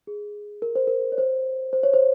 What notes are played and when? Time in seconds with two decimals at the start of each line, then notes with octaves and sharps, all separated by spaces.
0.07 G#4
0.62 A#4
0.76 C5
0.87 A#4
1.12 C#5
1.18 C5
1.73 C5
1.83 C#5
1.93 C5